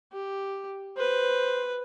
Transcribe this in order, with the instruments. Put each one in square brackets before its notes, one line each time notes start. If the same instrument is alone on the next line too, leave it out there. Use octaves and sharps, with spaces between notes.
[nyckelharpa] G4
[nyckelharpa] B4 [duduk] C5